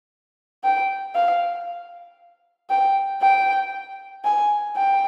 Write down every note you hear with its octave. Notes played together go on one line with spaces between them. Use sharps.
G5
F5
G5
G5
G#5
G5